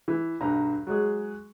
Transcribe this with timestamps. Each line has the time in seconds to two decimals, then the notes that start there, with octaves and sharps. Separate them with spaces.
0.08 E3
0.41 B1 G2 A#5
0.87 F#3 G#3 G#4